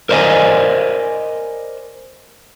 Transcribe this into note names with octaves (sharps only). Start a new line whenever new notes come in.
A#4 C5 D5 D#5 G#5